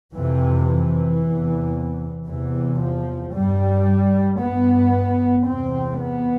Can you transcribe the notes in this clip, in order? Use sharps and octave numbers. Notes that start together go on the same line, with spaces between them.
F2 C3 E3
E3
E2 C3
E2 C3 E3
F3
G2 G3
G2 B3
E2 C3 C4
B3